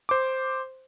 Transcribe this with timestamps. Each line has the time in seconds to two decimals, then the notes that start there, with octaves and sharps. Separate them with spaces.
0.09 C5 D6